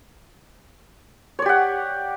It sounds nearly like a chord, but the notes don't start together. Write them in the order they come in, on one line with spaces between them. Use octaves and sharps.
C#5 D5 G4 F#5